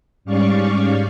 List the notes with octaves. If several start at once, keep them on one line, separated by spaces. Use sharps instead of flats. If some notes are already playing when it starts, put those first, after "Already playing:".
G#2 G3 C#4 D5 F5 C#6